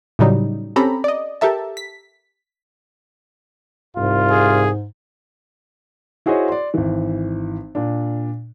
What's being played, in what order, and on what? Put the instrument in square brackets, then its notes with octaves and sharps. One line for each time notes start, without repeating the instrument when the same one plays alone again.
[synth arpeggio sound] A2 C#3 F#3 G3 D#4
C4 C#4 G4 A4 A#5 B5
D5 D#5
G4 A4 A#4 E5 A5
B6
[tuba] C2 [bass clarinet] G#2 [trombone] F4
[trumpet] G#4
[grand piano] E4 F#4 G#4 C5 C#5 D#5
D5 C6
G#1 E3
A#2 D4